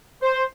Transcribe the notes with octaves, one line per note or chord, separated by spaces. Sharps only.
C5